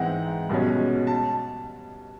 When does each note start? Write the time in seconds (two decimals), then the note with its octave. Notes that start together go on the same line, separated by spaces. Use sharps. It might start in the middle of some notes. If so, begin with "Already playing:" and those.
Already playing: G#2 E3 G#3 C4 F#5
0.49 C2 B2 G#3 C#4
1.07 A5